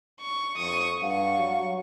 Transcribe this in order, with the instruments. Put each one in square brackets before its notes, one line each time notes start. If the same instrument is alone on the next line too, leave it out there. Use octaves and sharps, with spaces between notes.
[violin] C#6
[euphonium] F2 [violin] C#6 D#6
[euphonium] G2 [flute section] F5 F#5 [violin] C#6
[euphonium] F#3